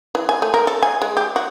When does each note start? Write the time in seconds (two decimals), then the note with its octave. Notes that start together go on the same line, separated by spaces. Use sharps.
0.15 E3
0.29 G#5
0.42 A3
0.54 A#4
0.67 A4
0.82 G#5
1.02 G#3
1.17 G4
1.36 F#4